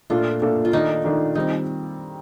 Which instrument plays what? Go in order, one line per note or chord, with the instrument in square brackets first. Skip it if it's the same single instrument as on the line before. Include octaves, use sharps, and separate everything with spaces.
[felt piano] A#2 A3 D4 A4 [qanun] F4
[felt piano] A#2 A3 D4 A4
[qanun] F4
[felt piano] D#3 A3 D4 [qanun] D#4
[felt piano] D#3 A3 D4
[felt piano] D#3 G3 C4 [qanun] D#4